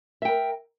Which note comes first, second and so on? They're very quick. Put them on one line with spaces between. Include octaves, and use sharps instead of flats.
E5 G5 A#4